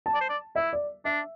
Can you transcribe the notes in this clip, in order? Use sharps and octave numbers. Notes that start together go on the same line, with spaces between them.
A5
D5
C5
D5
E4 E5
D5
D4 E5